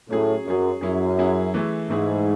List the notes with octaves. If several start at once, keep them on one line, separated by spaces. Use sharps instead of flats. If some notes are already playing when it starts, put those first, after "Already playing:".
A2 F#3 C#4 G#4
F#2 F#3 C#4 G#4
F#2 F#3 C#4 E4 G#4
F#3 C#4 E4 G#4
E3 A3 E4 G#4
G#2 E3 A3 E4 G#4